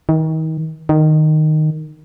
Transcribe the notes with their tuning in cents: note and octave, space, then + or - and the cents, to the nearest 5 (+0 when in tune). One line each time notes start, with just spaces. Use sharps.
D#3 +35
D#3 -10